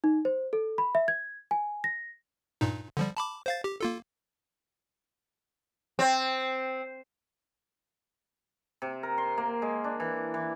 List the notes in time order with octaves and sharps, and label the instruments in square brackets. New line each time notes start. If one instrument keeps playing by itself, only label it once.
[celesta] D#4
C5
A4
B5
E5
G#6
G#5
A#6
[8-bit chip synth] G2 A#2 D#4
D3 F3 G3
A5 B5 D6
C5 F5 A6
G4
A#3 F4 A4
[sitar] C4
[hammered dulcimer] C3
A#4
C6
A#3
G#3
D4
E3
E3